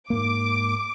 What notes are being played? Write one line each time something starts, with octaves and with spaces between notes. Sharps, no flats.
G#2 A#3 D6